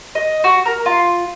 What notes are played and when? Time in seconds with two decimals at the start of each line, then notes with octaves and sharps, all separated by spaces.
0.15 D#5
0.44 F#4
0.66 A#4
0.86 F4